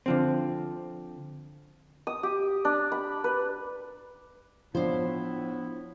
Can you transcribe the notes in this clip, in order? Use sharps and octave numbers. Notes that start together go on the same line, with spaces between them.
D3 F3 C4
D#6
G4
D4
B5
B4
A2 F3 B3 D4 E4 C5